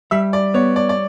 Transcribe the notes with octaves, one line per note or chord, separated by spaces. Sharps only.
G3 E5
D5
B3 C#5
D5
D5